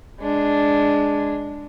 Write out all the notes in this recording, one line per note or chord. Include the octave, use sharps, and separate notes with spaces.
G#3 D4